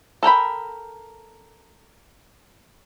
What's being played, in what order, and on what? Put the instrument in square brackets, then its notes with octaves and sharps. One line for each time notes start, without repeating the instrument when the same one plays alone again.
[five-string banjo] A4 A#4 G5 B5